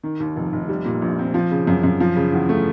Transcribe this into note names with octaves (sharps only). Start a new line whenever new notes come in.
D#3
D#2
F1
F1
G3
A#2
A#1
C4
F3
C#3
F#2
F#2
F3
C#3
E2
A3